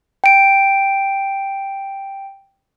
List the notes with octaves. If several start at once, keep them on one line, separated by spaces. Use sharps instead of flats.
G5 D7